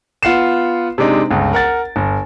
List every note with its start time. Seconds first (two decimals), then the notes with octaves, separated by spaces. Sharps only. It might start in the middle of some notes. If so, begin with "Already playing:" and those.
0.23 B3 F4 F#5 C7 E7
0.98 C3 G#3 D4 D#4
1.31 G1 C#2
1.53 A#4 F#5 A6
1.96 G1